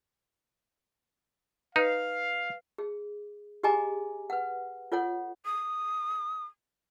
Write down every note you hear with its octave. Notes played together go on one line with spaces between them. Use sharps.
D#4 B4 F5
G#4
G4 G#4 D#5 G#5 A#5 D6
B4 F#5
F4 A4 C#5 F#5
D#6